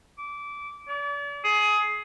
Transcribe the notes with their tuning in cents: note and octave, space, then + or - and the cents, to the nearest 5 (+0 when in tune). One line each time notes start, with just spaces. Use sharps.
D6 -20
D5 -40
G#4 +20